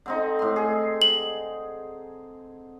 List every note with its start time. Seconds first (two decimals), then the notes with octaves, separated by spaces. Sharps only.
0.06 D3 C4 D#4
0.39 A2 C6
0.56 G#4
1.02 F#7